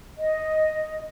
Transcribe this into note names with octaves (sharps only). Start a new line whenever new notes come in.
D#5